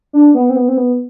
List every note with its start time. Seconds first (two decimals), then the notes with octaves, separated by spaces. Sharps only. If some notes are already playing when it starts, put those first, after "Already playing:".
0.13 D4
0.34 B3
0.50 C4
0.56 B3
0.68 C4
0.77 B3